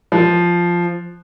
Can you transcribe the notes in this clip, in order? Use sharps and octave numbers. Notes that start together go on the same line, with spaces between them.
F3